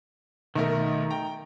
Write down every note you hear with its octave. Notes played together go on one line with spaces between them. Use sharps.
B1 D#3 A3 A#4
G5 A#5